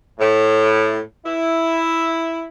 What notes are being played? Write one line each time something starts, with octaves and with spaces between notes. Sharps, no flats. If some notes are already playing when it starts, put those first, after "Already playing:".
A2
E4